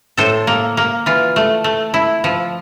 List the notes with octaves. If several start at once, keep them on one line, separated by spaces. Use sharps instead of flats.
A2 A4 C5
A#3
A#3
E3 F4
A3
A3
E4
F3